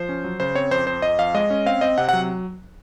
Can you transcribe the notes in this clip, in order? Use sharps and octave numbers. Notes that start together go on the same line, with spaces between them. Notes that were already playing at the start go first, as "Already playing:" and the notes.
Already playing: F3 C5
C#4
F#3
C#3 C5
C4 C#5
F2 C5
F2 C5
F2 D#5
F2 F5
G#3 D#5
C#4
C4 F5
C4 D#5
C3 F#5
F#3 F#5